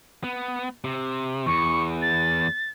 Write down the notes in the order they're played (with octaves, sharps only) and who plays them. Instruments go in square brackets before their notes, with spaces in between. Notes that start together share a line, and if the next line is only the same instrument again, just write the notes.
[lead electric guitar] B3
C3
[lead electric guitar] E2 [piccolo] C#6
[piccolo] A6